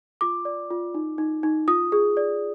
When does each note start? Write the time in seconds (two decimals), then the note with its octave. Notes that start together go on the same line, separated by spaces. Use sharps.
0.21 F4 D6
0.45 D5
0.71 F4
0.94 D#4
1.18 D#4
1.43 D#4
1.68 F4 D#6
1.92 G#4
2.17 D5